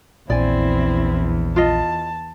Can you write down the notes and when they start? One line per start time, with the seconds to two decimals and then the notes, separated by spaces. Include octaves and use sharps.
0.30 A#1 E2 C4 E4 D5 G#5
1.56 F4 D#5 A5